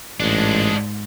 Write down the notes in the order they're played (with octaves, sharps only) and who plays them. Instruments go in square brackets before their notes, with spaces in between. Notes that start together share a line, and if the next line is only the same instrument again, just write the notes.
[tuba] A1 [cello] G#2 [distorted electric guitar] G#3 D4